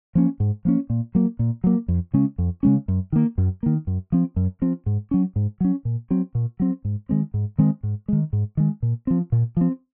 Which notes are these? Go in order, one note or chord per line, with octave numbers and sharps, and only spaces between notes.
F3 A#3 C#4
G#2
F3 A#3 C#4
A#2
F#3 A#3
A#2
F#3 A#3
F2
C#3 G#3 C#4
F2
C#3 G#3 C#4
F#2
D#3 A#3
F#2
D#3 A#3
F#2
F3 C4
F#2
F3 C4
G#2
F#3 C#4
G#2
F#3 C#4
A#2
F#3 C4
A#2
F#3 C4
G#2
D#3 G#3 C4
G#2
D#3 G#3 C4
G#2
D#3 G#3
G#2
D#3 G#3
A#2
F3 C4
A#2
F3 C4